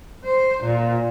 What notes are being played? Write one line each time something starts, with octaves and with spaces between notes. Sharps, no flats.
C5
A#2